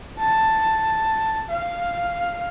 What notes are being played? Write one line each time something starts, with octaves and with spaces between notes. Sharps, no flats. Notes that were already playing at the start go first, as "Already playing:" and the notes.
A5
F5